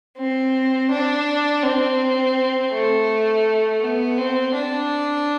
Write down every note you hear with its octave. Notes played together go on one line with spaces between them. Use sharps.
C4
D4
C4
A3
B3
C4
D4